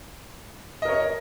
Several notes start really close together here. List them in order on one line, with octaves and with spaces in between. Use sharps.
D#5 A#4 C#5